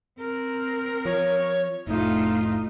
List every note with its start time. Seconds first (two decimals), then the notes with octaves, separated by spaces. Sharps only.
0.19 C4 A#4
1.05 F3 C#5
1.87 F1 A2 A3 D#4 F4